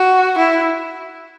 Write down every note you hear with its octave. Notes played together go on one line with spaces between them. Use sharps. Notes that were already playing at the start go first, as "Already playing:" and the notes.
Already playing: F#4
E4